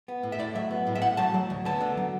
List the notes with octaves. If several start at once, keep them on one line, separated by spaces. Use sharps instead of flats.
B3
A2
E5
A2 D5
F#3 E5
B3
A2
E5
A2 F#5
F#3 A5
F#3
D2
B3 A5
D3
F#3